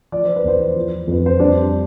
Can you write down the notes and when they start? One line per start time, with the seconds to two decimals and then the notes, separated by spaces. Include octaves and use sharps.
0.12 F3 D5
0.24 C5
0.36 B4
0.44 E2 C5
0.76 F3
1.07 F2 B4
1.26 C5
1.40 G3 D4 D5